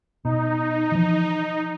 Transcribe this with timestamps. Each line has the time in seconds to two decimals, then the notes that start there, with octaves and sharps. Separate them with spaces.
0.25 B2 D#4
0.92 E3 F3